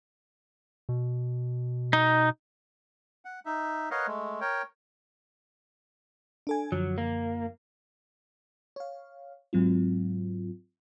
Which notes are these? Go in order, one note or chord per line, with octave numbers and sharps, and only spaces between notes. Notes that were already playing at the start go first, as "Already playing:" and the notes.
B2
D#4
F#5
D#4 E5
A#4 B4 C#5 D#5 F5 F#5
G#3 A3
A#4 C#5 G5
D4 A4 G#5
F#2 D3 F3 F#3
A#3
C#5 F5
G#2 F#3 C4 F4